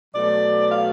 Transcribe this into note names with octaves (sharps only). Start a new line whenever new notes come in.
B2 F#3 A3 D5
F5